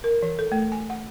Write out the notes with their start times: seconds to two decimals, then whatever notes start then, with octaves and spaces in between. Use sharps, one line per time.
0.04 A#4
0.22 E3
0.39 A4
0.52 A3
0.72 G#5
0.90 F#5